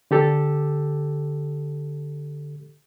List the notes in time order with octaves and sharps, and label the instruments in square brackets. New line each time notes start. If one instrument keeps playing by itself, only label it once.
[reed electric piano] D3 G4 A4